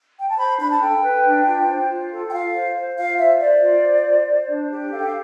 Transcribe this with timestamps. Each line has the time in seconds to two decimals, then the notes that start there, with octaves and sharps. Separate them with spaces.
0.18 G5
0.28 A5
0.38 C5 B5
0.59 D4 B5
0.71 A5
0.81 A4 G5
1.02 B4
1.25 D4
1.45 F4
1.67 C5
1.89 F4
2.11 A4
2.28 G5
2.32 F4 F5
2.53 C5
2.75 C5
2.97 F4 F5
3.18 C5 E5
3.40 C5 D5
3.62 F4
3.83 C5
4.05 C5
4.27 C5
4.48 D4
4.70 G4
4.92 A4 F5
4.99 G5
5.06 F5